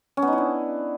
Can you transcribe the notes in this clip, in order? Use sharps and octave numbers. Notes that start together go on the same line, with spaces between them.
C#4
B3
D#4
E4
D4